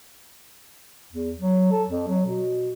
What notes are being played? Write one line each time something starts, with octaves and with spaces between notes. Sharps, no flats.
E2
F#3
A4
F2
F#3
B2